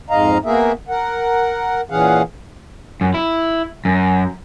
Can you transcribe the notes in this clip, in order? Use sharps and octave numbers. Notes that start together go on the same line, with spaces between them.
F2 G#2 G#3 D#5 F5 A#5
A#3 B3 F#4 G#4 A#4 E5
A#4 F#5
A#2 E3 C#4 G#4 F5 F#5
F#2
E4
F#2